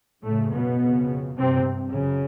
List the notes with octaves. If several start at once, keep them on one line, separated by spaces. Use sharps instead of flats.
F#2 A2 C#3 A3
B2 B3
F2 C#3
G2 C3 C4
F#2 C#3